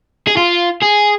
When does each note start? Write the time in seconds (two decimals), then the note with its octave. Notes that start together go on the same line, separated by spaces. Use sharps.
0.27 G#4
0.37 F4
0.83 G#4